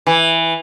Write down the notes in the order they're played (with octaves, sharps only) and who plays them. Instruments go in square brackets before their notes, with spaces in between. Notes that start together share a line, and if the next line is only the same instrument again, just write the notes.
[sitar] E3